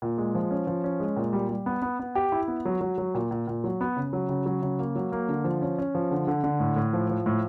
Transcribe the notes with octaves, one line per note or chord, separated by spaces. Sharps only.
A#2
G#3
F3
C#4
F3
C#4
G#3
A#2
G3
G3
B3
B3
B3
G4
E4
B3
F#3
F#3
F#3
A#2
A#2
A#2
F#3
B3
C#3
F#3
C#3
F#3
C#3
A#3
F#3
A#3
D3
F3
C#4
C#4
F3
D3
D3
D3
A2
A2
F3
F3
A2